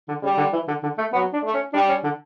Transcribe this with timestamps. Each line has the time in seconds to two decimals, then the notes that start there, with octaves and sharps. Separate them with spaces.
0.08 D3
0.23 C#3 G3
0.38 D3
0.53 E3
0.68 D3
0.83 D3
0.98 A3
1.13 F#3 B3
1.33 D4
1.43 A3
1.54 C#4
1.73 G3 D4
1.89 C#4
2.04 D3